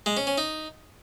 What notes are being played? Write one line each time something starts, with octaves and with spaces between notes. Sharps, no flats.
G#3
C#4
C#4
D#4